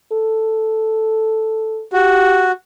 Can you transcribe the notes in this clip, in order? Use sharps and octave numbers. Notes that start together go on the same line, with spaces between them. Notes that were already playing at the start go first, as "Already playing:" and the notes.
A4
F#4 G4